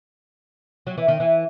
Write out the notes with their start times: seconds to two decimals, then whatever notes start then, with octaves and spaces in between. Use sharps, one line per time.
0.87 F#3
0.98 E3
1.08 D#3
1.20 E3